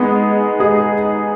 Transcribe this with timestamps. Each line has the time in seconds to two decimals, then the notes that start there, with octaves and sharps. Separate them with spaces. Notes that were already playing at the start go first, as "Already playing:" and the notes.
Already playing: G#3 B3 D#4 G#4
0.60 G#3 D#4 G#4